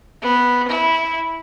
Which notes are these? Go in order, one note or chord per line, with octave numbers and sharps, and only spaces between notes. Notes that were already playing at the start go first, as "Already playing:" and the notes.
B3
E4